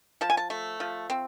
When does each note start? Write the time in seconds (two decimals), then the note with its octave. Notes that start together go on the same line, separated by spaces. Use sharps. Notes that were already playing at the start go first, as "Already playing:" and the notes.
0.21 F3 A5
0.30 G#5
0.37 A5
0.50 A3
0.80 F3
1.10 C4